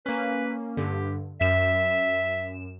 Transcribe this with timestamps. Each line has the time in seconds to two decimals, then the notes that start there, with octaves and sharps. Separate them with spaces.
0.06 A#3 C#4 B4
0.77 G2 D3 G4
1.41 F#2 E5 E7